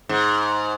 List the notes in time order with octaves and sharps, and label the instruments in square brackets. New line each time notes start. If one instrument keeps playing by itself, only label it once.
[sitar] G#2